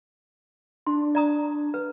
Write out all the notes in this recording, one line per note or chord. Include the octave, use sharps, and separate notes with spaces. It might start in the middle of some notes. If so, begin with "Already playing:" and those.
D4 C6
D5 A#5 D#6
B4